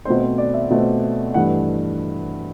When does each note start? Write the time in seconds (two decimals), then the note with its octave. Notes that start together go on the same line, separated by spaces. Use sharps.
0.05 B2 A3 C4 C5
0.22 C5
0.38 D5
0.54 E5
0.70 B2 A3 C4
1.34 G2 E3 A3 F#5